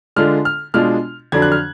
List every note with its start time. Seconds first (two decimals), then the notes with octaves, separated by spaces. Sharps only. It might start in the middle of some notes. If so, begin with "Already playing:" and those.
0.16 D3 G#3 D4 F4 F6
0.45 F6
0.74 B2 G#3 D4 F4 F6
1.32 F2 D3 F#3 D4 G#6
1.42 F#6
1.52 F6